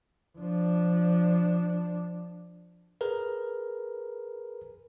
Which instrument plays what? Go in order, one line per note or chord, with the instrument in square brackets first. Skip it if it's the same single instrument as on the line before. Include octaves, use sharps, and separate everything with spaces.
[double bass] F3 D4
[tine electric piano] G#4 A#4 B4